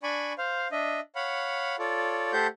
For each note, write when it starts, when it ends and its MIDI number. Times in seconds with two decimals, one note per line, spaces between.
0.03 0.33 62
0.03 0.33 74
0.03 0.33 80
0.03 0.33 83
0.03 0.33 85
0.38 0.68 72
0.38 0.68 77
0.72 1.00 62
0.72 1.00 75
0.72 1.00 76
1.16 1.76 73
1.16 1.76 77
1.16 1.76 78
1.16 1.76 83
1.79 2.33 65
1.79 2.33 69
1.79 2.33 73
1.79 2.33 74
2.33 2.47 57
2.33 2.47 67
2.33 2.47 69
2.33 2.47 72
2.33 2.47 78
2.33 2.47 91